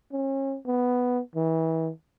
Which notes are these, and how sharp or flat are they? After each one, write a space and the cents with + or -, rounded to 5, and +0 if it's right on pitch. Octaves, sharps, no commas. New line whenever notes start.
C#4 -35
B3 +0
E3 -30